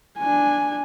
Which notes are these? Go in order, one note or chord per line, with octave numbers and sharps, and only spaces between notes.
D4 G#5